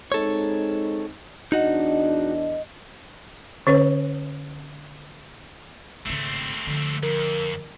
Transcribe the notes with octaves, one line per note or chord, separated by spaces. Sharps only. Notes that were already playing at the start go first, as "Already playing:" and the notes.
G#3 C4 D#4 A4 C#5
E2 D4 D#4 F#4 D#5 F#5
D3 C#4 B4 C#5
G#1 C#3 A3 C4
D3 F3
F2 A#4